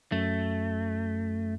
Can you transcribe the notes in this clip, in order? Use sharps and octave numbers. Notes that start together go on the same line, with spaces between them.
F#2 A3